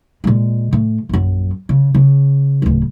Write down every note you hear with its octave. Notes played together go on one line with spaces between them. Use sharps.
A#2 G#3
A2
A#1 F#2
C#3
C#3
D1 C#2